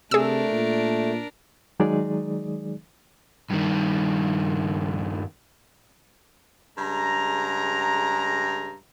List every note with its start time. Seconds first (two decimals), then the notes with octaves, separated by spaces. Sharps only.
0.11 C3 A3 D4 G#4 A#4 E6
0.51 A#2
1.80 D#3 F#3 G#3 D#4 G#4 D5
3.50 G2 D#3
6.77 G2 C#3 G#3 A#5